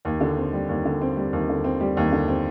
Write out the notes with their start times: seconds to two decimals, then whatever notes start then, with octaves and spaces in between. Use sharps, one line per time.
0.05 D#2
0.21 D3
0.37 C4
0.53 G3
0.69 D#2
0.85 D3
1.01 C4
1.17 G3
1.33 D#2
1.49 D3
1.64 C4
1.81 G3
1.97 D#2
2.12 D3
2.28 C4